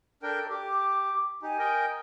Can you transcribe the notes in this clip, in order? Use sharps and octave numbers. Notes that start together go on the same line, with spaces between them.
D4 A4 A#4 G5
G4 D6
D#4 G4 G#5
A#4 D#5 G5